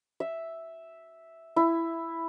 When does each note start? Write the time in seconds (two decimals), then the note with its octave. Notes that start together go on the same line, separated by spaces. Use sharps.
0.20 E5
1.56 E4